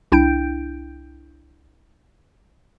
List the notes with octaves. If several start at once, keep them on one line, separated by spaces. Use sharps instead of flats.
C2 D4 E4 G5 G6 D7